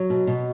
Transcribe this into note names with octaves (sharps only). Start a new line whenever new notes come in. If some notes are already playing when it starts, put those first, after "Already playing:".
Already playing: F#3
B2
B2